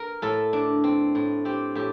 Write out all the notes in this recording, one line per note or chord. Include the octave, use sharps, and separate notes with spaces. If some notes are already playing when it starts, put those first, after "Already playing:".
Already playing: A#4
A2 A4
D4
C4
A2
C4 G4
A2 G4